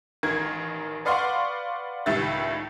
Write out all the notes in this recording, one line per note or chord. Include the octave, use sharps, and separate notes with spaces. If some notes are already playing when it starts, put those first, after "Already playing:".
A1 D#3 A#4 G#6
B4 D5 F5 F#5 C6 C#6
C#2 A2 D#3 G3 E5 A6